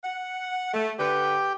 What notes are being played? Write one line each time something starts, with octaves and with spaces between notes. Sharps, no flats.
F#5
A3
D3 G4 B4 G5